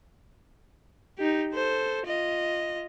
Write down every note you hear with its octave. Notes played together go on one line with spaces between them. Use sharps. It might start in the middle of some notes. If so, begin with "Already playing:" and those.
D#4 G4
A4 C5
F4 D#5